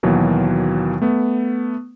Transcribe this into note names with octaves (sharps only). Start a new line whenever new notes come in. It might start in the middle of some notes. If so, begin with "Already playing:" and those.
D#2 B2 E3 F#3 A#3
A3 B3